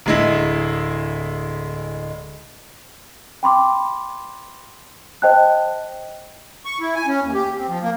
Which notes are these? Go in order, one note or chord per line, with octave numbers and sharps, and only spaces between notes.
D1 G#3 E4
G5 B5 C6 D6
C5 D#5 G5 A5 F#6
C#6
E4
G#5
C#4
D#2
G4
C4
F3
A#3